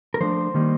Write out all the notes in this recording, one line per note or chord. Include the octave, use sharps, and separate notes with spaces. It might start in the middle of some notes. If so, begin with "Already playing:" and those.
A#4
F3 A3 D4 C5
D#3 G3 A#3 D#4